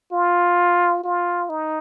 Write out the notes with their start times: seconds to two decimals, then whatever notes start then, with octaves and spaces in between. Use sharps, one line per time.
0.12 F4
1.04 F4
1.49 D#4